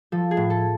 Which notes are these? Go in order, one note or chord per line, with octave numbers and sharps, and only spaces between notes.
F3 A4
G#4
A2
A4